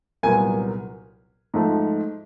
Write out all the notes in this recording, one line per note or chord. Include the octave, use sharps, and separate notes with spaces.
C2 A#2 F#3 B3 G#5
G#2 F3 A3